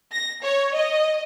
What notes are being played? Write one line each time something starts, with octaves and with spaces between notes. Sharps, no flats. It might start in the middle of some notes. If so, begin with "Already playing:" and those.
A#6
C#5
D#5